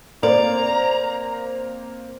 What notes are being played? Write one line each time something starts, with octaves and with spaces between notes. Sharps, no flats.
A#3 C4 D5 A#5